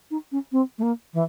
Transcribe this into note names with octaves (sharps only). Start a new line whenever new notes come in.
D#4
C#4
C4
A3
A#3
E3